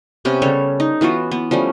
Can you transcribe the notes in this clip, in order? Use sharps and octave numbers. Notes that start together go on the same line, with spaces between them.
C3 B3 C#4 G4
C#3 G3 A4 C#5
D#4
E3 B3 F4 F#4
B3
F3 G3 A3 C#4